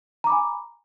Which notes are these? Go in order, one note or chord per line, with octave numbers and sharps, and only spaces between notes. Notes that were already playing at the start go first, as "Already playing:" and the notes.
G#5 A#5 B5 D6